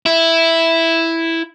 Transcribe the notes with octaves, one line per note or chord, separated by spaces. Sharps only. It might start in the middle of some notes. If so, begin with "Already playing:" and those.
E4